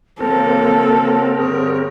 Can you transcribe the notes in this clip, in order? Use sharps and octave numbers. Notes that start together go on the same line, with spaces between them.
C#3 F#3 A#3 C4 A4 A#4
G2 D3 G#4 C#5